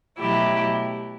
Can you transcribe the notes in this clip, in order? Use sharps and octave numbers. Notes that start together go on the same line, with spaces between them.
B2 F#3 A3 E4 G4